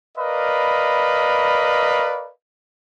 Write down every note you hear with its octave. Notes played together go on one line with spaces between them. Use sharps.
A#4 B4 D5 D#5 F5 B5